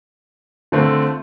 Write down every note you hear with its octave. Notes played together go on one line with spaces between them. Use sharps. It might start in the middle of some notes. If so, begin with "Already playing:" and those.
D3 A3 C4 F4